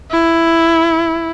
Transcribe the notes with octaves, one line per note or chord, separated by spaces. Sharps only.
E4